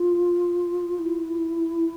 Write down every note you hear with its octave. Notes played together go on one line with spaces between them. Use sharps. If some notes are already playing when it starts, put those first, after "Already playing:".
Already playing: F4
E4